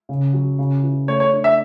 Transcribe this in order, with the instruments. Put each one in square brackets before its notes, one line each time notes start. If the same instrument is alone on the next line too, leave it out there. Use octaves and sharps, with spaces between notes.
[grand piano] C#3
F#3
C#3
E3
[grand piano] A3 [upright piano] C#5
[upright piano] C#5
[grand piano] D4
[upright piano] E5